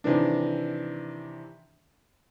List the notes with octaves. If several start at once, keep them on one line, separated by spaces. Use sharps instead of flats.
C3 D#3 E3 D4